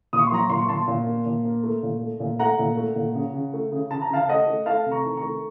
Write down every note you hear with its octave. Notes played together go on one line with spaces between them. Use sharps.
A#2 D#6
C#6
C6
F#3 A#5 C#6
A#2 C6
C#6
A#2 A5 C6
A#2
A#3
A#2
A#3
A3
A#2
A3
A#2
A3 F#5 A#5
A#2
A3
A#2
C#3
C#3
A3
C#3
C#3 A5
A#5
C#3 F5 A5
A3 D#5 F#5
A3
A3 F5 A5
C3
A#5 C#6
D#3
A#5 C#6
A3